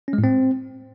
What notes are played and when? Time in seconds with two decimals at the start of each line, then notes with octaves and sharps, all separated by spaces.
0.08 C#4
0.13 G#3
0.18 A2
0.24 C4